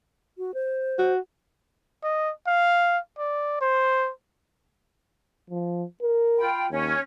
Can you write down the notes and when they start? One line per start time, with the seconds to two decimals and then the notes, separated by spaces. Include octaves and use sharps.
0.38 F#4
0.54 C5
0.99 F#4
2.03 D#5
2.47 F5
3.18 D5
3.61 C5
5.50 F3
6.02 A#4
6.38 F4 G5 B5
6.70 D#2 C#4